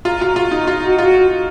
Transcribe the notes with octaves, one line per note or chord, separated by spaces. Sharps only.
F4 A#5
F4 F#4
F4 F#4
D#4 A#5
F4 D#5
F#4
F4 F#4